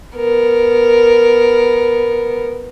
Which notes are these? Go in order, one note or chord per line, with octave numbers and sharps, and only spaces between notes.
B3 A#4